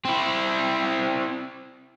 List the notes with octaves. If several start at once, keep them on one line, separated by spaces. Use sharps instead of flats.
C4 E4